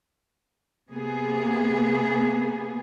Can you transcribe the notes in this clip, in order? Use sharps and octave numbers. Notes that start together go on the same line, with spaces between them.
C3 A#3 B3 G#4